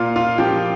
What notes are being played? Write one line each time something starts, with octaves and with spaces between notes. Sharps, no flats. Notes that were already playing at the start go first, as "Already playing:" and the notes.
Already playing: A#2 F4 F5
F4 F5
F3 G4 G5